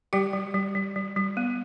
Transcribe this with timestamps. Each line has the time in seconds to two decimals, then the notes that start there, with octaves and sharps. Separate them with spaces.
0.13 G3 G4 G5
0.33 G3
0.54 G3
0.75 G3
0.96 G3
1.16 G3
1.37 B3